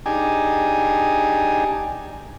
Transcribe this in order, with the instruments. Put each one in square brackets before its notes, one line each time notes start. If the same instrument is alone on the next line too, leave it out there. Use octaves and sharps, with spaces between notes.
[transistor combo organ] D4 D#4 G4 G#4 G#5